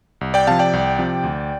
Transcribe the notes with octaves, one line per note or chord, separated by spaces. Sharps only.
C2
D5 G5
C3 F3 F5 A5
D5 G5
C2
C3 F3
D2